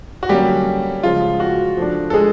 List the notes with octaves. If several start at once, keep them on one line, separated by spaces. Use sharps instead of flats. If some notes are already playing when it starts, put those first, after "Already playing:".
F#4
D3 F#3 G3 A#3 C#4 G4
C#3 F3 G#3 F4
F#4
F3 A3 D4
A4
G#3 G#4